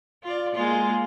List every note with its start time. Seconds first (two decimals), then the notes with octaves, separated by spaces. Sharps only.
0.24 F4 D5
0.54 G#3 A#3 F4